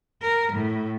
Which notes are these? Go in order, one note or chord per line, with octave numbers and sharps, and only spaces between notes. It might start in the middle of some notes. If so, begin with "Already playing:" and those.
A#4
A2